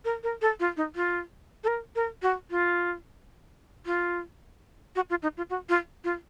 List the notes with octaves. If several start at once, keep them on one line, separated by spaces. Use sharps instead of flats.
A#4
A#4
A4
F4
D#4
F4
A4
A#4
A#4
F#4
F4
F4
F#4
F4
D#4
F4
F#4
F4
F4